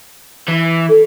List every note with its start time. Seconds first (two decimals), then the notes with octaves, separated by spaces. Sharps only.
0.48 E3
0.89 A4